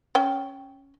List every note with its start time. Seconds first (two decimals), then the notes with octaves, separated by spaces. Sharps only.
0.15 C#4 G5